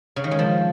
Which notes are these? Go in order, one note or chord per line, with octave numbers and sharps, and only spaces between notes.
C#3
D#3
G#3
F3